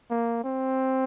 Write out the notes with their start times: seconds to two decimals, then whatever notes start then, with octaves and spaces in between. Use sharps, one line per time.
0.11 A#3
0.44 C4